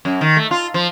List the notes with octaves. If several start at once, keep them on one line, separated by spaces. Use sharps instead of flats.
F#2
D#3
A3
F4
F3